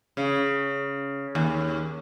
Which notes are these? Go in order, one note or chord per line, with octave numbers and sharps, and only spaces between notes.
C#3
D#2